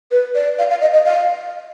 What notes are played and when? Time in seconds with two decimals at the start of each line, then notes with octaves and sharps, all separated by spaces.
0.11 B4
0.35 D5
0.59 F5
0.70 F5
0.81 D#5
0.94 D#5
1.06 F5